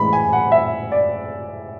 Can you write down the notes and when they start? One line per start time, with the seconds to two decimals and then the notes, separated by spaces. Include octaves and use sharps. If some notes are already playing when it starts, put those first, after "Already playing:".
Already playing: A2 E3 G#3 B5
0.13 G#5
0.33 F#5
0.52 E5
0.92 D5